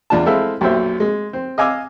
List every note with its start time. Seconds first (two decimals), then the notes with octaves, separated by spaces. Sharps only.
0.10 E2 D4 F4 A5
0.26 G#3 C4 E4 A4 E5 F5
0.61 B1 F#2 A#2 G4 C5 E5
1.00 G#3
1.33 C4
1.58 D#5 F5 G#5 D6 E6